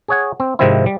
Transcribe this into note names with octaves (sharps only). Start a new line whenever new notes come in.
G#4 C#5 F#5
C4
G#2 C3 D#3 F3 C4 E4
G3